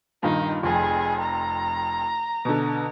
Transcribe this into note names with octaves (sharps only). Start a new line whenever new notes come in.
G2 A#2 D#3 D#4
F1 F2 G#4
A#5
B2 D3